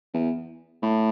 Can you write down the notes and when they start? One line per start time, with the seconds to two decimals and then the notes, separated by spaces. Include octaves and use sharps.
0.14 E2
0.82 A2